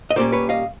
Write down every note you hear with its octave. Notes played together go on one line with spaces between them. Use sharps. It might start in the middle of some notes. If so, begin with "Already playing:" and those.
D#5
A#2 G3 A#3 C#4 C5 D5
B4 C#5
D#5 F5